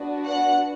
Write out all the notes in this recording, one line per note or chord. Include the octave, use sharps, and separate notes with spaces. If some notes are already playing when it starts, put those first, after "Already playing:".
Already playing: B3 D4 F#4
F#5